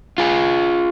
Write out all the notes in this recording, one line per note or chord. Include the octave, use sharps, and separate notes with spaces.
F4 G#4